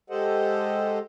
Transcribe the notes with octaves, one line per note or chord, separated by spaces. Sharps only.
G#3 G4 A4 C5 D#5 F#5